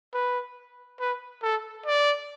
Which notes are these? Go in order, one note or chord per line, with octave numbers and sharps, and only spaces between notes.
B4
B4
A4
D5